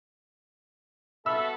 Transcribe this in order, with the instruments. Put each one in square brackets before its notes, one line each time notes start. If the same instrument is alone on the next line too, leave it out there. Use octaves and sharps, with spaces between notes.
[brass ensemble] B3 F#4 A4 [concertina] E5 B5 [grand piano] E6